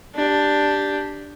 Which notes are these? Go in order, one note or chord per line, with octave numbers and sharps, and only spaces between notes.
D4 G4